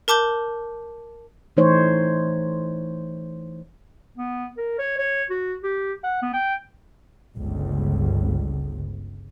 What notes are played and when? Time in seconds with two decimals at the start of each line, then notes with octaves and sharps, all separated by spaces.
0.08 A#4 A5 D6 G6 G7
1.57 E3 A3 D#4 C5 C#5
4.18 B3
4.57 A#4
4.79 C#5
4.98 C#5
5.30 F#4
5.64 G4
6.04 F#5
6.22 B3
6.34 G5
7.36 G1 C#2